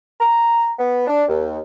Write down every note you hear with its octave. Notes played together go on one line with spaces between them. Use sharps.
A#5
B3
D4
D#2